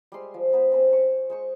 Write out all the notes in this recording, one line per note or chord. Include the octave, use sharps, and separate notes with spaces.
G3 G#3 C6
F3
B3 B4 C5
C4 C#4 B4 C5
C5 C#6
G#3 C5 C#6